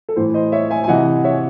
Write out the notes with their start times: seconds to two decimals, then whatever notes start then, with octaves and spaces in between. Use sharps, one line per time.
0.09 A4
0.16 A2 E3 C5
0.34 C5 D#5
0.52 C#5 E5
0.70 E5 G#5
0.84 G#5
0.88 C3 E3 D#5 F#5
1.24 C#5 E5